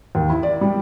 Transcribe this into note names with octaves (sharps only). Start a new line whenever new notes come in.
D#2
E4
D5
G3